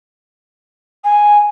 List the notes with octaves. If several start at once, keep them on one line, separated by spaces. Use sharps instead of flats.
G#5